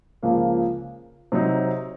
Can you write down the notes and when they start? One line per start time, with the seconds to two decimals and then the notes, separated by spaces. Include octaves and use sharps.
0.23 C#2 C#3 F3 A#3
1.32 C3 F#3 C4 D#4